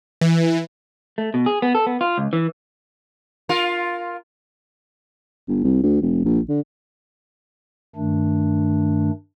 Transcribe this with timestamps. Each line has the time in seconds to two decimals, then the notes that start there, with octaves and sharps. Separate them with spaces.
0.21 E3
1.18 A3
1.34 B2
1.46 G#4
1.62 B3
1.75 A4
1.87 B3
2.01 F4
2.18 C#2
2.33 E3
3.49 F4 A#4
5.48 G1
5.64 C2
5.83 D2
6.02 F1
6.25 A#1
6.49 D3
7.96 G2 D#3 A3 D4